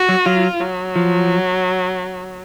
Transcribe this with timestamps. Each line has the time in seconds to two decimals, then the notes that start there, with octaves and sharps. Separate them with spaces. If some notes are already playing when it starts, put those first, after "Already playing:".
Already playing: F#4
0.09 F#3
0.25 F#3 F4
0.61 F#3
0.96 F3